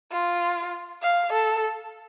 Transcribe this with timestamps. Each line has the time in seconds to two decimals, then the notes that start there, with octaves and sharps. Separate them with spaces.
0.12 F4
1.03 F5
1.33 A4